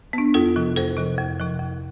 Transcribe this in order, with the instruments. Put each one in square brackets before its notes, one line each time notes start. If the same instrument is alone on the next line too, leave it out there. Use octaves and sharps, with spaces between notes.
[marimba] B3 D4
F2 F4 A4
C3 F3
F2 A4 C5
C3 F3
F2
C3 F3
F2